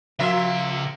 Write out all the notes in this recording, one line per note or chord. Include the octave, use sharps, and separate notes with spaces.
C#3 F3 A#3 E5 C6